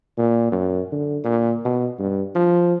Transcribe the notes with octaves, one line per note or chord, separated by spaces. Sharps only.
A#2
F#2
D3
A#2
B2
G2
F3